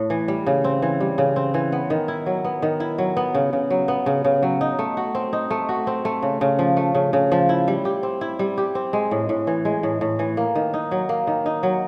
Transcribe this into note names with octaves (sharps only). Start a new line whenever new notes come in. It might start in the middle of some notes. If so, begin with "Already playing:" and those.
Already playing: A2 A3
E3
G3
C#3
C4
E3
G3
C#3
C4
E3
B3
D#3
E4
F#3
B3
D#3
E4
F#3
B3
C#3
C#3
F#3
B3
C#3
C#3
F#3
D#4
A3
F#4
C4
D#4
A3
F#4
C4
A3
C#3
C#3
F3
A3
C#3
C#3
F3
E4
G3
G4
C4
E4
G3
G4
C4
G#3
A2
A2
E3
G#3
A2
A2
E3
A#3
D#3
D#4
F#3
A#3
D#3
D#4
F#3